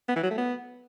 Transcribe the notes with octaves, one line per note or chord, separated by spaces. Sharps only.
B3
E3
F#3
A3
B3